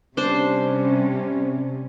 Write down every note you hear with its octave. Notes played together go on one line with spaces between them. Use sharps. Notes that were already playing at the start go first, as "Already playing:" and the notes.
C3 G3 C#4 D4 C5